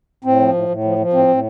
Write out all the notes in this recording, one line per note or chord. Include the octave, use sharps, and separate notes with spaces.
A2 C4
F3
A2
A2
F3
F3
A2 C4
A2